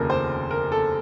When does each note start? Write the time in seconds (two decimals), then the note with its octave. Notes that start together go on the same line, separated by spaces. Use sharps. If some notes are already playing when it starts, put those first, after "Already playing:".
Already playing: F1 D#2 C#3 F3 A#4
0.10 C5
0.51 A#4
0.72 A4